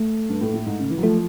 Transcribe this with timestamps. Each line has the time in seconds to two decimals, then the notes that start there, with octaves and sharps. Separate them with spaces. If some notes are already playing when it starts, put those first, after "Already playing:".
Already playing: A3
0.29 G2
0.41 A2
0.54 A2
0.66 G#2
0.79 C#3
0.90 E3
0.98 F#3
1.03 F3 A3